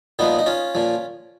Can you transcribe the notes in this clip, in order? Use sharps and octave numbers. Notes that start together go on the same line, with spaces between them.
A#2 F3 B3 D#4
D#4
C#4 F4
A#2 F3